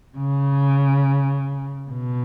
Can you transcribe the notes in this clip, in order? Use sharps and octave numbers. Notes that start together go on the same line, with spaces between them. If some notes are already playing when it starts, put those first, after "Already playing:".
C#3
B2